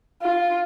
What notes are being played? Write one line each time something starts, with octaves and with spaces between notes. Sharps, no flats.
F4